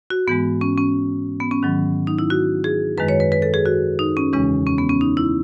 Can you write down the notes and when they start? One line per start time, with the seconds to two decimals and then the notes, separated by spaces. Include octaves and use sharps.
0.10 F#4
0.27 G#2 E3 G#3 B3
0.61 C#4
0.78 C#4
1.40 B3
1.51 C#4
1.63 G#2 D#3 F#3
2.07 D#4
2.19 E4
2.30 F#4
2.64 G#4
2.98 F#2 D#3 G#3 B4
3.08 C#5
3.20 B4
3.32 B4
3.42 A4
3.54 G#4
3.66 F#4
3.99 D#4
4.17 C#4
4.33 E2 C#3 E3 G#3 C#4
4.67 C#4
4.78 B3
4.89 C#4
5.01 D#4
5.17 E4